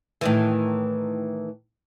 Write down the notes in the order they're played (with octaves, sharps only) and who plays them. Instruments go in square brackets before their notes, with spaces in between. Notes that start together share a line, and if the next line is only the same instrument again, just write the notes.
[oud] A2 D#3 E3